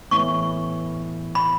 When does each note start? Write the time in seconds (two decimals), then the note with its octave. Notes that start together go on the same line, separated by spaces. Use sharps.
0.11 A2 E3 B3 E4 C#6
1.35 B5